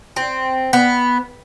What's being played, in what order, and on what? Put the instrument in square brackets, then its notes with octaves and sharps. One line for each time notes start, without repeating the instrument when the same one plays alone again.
[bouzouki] C4
B3